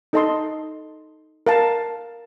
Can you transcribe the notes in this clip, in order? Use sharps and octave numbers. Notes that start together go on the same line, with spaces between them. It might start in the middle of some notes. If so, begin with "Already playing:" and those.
D#4 A4 D#5 A5 C6
A#4 F5 A5